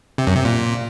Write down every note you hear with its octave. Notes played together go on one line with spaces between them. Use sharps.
C3
F#2
C3
A#2